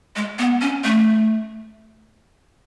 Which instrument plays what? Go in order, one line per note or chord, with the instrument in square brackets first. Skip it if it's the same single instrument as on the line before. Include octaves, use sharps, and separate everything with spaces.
[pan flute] G#3
B3
C#4
A3